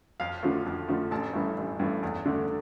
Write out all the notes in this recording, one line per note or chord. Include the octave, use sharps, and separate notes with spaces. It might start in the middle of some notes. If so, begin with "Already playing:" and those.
F2 F5
D3 F3 A3
F2
D3 F3 A3
A1 A5
G2 E3 A3
A1
G2 E3 A3
E2
D3 A3